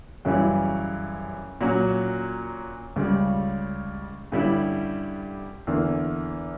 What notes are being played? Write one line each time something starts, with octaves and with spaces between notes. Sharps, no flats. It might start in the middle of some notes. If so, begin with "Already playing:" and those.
F#2 C#3 E3 G3
A#2 F#3 C#4
C#2 C#3 G3
G2 D3 G3 C#4 E4
E2 D3 A#3